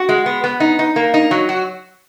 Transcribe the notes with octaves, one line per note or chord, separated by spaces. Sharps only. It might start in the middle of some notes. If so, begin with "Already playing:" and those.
Already playing: F#4
G#3
B3
B3
D#4
D#4
A#3
D#4
F#3
F#4